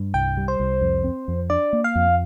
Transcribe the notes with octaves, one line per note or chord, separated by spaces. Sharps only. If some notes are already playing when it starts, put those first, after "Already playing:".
Already playing: G2
C2 G5
G3
C5
C2
F2
C4
F2
D4 D5
A#3
F5
F2